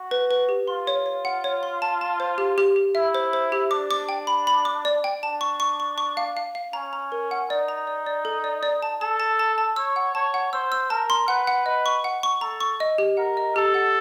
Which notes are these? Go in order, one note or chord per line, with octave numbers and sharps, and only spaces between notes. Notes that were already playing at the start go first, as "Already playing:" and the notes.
Already playing: F#4
B4
B4
G4
F4 C6
C#5
C#5
F#5
C#5
C6
A5
A5
C5
G4
G4
G4
E4 E5
C5
C5
G4
D4 D6
D6
G5
B5
B5
D6
D5
G5
D4 A5
C#6
C#6
C#6
C#6
F5
F5
F5
C#4 A#5
A#5
A#4
F#5
D#4 D5
A#5
D5
D5
A4
D5
D5
A5
A4 A5
A5
A5
A5
C#5 E6
F#5
C#5 A5
F#5
C5 E6
E6
A#4 A5
C6
B4 F#5
F#5
B4 D#5
C#6
F#5
C#6
A4 A#5
C#6
D#5
G4
A#4 F#5
D#5
G4 A4
F#5